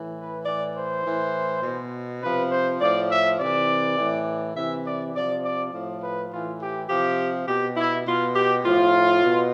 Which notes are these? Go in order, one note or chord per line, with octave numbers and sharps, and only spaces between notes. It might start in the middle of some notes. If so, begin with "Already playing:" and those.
Already playing: A2 E3
B4
A2 E3 D5
C5
A2 E3
B2
C3 F3 B4
C5
A2 F3 D5
E5
C3 E3 D5
A2 E3
C3 E3 E5
D5
C3 F3 D5
D5
A2 F3
B4
A2 E3 F4
G4
C3 F3 G4
B2 G4
E4
B2 F4
G4
A2 F3 F4
B2